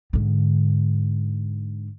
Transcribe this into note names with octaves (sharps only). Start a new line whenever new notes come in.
G#2 D3